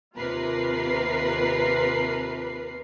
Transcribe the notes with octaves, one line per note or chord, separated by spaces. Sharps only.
D#2 C3 F4 A#4 B4 C7